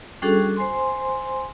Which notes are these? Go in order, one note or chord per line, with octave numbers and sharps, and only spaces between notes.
G3 C#4 D4 F#4 G#4 A4
C5 G#5 C6